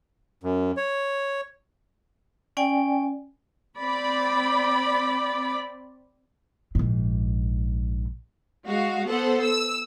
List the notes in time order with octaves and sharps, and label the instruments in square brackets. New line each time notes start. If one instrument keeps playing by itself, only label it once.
[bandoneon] F#2
C#5
[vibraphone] C#4 D5 G5 G#5
[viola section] C4 D5 B5
[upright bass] A#1 G#2
[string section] G#3 F#4 F5
B3 A4 C5 F#5
E6